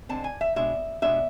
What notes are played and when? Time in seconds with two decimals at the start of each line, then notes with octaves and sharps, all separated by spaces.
0.09 D3 G#3 C4 A5
0.24 G#5
0.41 E5
0.56 B2 G#3 D4 E5
1.02 B2 G#3 D4 E5